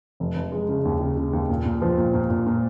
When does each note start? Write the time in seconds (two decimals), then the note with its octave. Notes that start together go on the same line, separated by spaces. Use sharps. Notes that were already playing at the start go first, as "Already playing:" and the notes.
0.20 F1
0.36 F1
0.52 G#3
0.69 C#3
0.85 D#2
1.01 C#3
1.17 C#3
1.33 D#2
1.49 A#2
1.65 A#2
1.82 F3
1.98 A#2
2.14 A#2
2.30 A#2
2.46 A#2